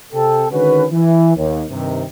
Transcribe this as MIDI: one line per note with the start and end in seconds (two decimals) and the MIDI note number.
0.13 0.46 48
0.13 0.46 69
0.13 0.46 79
0.51 0.84 50
0.51 0.84 51
0.51 0.84 56
0.51 0.84 61
0.51 0.84 66
0.51 0.84 71
0.91 1.32 52
1.36 1.62 39
1.70 2.03 43
1.70 2.03 48
1.70 2.03 51